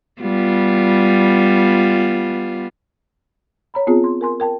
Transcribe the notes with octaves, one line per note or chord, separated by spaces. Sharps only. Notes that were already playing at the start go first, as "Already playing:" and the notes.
G3 B3 F4
C#5 A#5 B5
B3 C4 F4 G#4
C6
A#4 G#5 C6
A#4 G5 A5